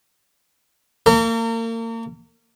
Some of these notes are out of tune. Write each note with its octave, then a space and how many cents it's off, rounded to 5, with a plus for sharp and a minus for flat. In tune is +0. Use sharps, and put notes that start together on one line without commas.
A#3 -35 A#4 -40